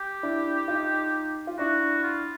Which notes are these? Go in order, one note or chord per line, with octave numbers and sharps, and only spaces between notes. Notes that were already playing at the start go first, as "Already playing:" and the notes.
Already playing: G4
D4 E4
D#4 F4
F4
D4 E4 F#4
F4